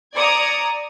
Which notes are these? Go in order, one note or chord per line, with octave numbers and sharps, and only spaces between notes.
D5 A#5 D#6 G#6 C#7